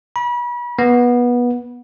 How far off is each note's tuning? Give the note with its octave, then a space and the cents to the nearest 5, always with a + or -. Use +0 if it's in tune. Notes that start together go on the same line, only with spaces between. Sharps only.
B5 -35
B3 -20